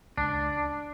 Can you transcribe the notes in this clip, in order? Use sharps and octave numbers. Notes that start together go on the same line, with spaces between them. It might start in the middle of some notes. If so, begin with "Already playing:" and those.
C#2 D4